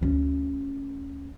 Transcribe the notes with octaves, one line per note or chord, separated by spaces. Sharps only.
D2 C#4